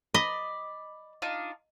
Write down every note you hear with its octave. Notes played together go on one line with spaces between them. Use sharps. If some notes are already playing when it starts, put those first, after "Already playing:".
D5 D#5 B5
D4 D#4 F4